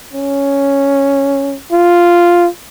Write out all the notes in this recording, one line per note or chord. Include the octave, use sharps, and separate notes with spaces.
C#4
F4